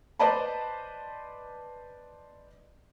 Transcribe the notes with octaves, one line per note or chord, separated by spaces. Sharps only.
B4 C5 D5 D#5 A5 B5